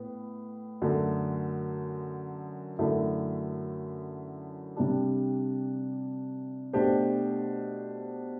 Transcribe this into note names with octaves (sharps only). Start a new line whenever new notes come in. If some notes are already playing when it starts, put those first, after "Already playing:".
Already playing: A2 B3
F#2 D3 A3
F#2 D3 A3 E4
C3 G3 D4
B2 A3 D4 G4 C5